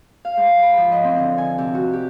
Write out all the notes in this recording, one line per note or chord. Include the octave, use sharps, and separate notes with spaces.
F5
G#2
B5
F3
D#5
C4
D3
G#5
C3
F#4
G4